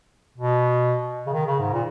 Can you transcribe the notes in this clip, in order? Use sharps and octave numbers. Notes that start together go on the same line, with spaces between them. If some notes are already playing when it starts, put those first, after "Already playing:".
B2
C#3
D#3
C#3
G#2
A#2